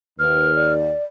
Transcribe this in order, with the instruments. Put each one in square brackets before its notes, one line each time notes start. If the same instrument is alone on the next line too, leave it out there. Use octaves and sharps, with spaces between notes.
[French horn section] D#2 [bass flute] B4 [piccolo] F6
[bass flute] D5